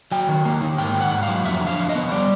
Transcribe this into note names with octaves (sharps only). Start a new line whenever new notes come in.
F#3 G5
D#3
A#3
D#3
G#2 G5
A#3
F#5
G#2
F5
F#3
F2 E5
D3
F5
F2
D#5
B3
G3 D5